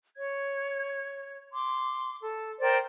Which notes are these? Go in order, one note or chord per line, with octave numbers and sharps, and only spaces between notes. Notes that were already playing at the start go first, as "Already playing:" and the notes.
C#5 G#6
C6 D6
A4
A#4 C5 D5 G5